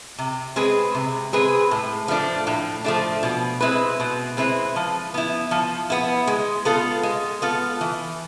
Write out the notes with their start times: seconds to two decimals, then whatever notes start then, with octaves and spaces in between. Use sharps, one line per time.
0.18 C3
0.56 G#3 C4 G#4 B4
0.94 C3
1.33 G#3 C4 G#4 B4
1.71 A2
2.08 F3 A3 D4
2.47 A2
2.84 F3 A3 D4
3.23 B2
3.61 G#3 C4 E4 B4
4.00 B2
4.37 G#3 C4 E4 B4
4.76 F3
5.14 B3 E4
5.51 F3
5.90 B3 E4
6.27 G#3
6.65 B3 F4 A4
7.03 G#3
7.42 B3 F4 A4
7.81 E3